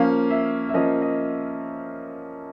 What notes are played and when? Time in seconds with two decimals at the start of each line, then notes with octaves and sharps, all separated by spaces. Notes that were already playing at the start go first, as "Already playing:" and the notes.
Already playing: F3 A#3 C#4 F5
0.30 E5
0.69 E5
0.74 F3 A#3 C#4 D#5
1.01 D#5